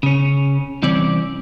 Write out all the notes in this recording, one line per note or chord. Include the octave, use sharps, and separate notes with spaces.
C#3 C#4
C2 E3 C4 C#4 D5